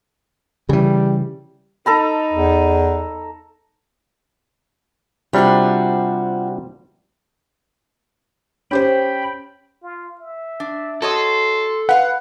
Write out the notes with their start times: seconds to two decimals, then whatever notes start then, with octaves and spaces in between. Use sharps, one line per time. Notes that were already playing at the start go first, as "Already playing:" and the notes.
0.69 C#3 E3 G3
1.86 D#4 A4 A#5 B5
2.33 E2
5.33 C3 G3 D4 F4 F#4 C5
8.71 C#4 G4 C5 G5 B5
9.83 F4
10.21 E5
10.60 D4
11.02 F#4 A4 C#5 D#5 C6
11.89 B4 F5 F#5